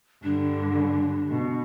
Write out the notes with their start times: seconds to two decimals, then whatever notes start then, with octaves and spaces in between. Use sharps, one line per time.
0.24 G2 D3 D4
1.31 B2